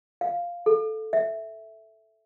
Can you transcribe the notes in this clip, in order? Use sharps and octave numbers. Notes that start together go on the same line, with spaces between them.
F5
A4
E5